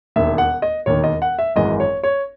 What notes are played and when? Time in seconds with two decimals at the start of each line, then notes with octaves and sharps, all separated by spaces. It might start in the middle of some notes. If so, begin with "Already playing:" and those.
0.16 E1 D#2 D#3 E5
0.38 F#5
0.62 D#5
0.86 E1 D#2 D#3 C#5
1.04 D#5
1.22 F#5
1.39 E5
1.56 G#1 F#2 E3 G#3 D#5
1.80 C#5
2.03 C#5